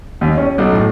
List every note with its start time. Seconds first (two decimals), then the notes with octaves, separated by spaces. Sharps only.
0.21 D#2
0.38 C#4
0.58 B1
0.73 A2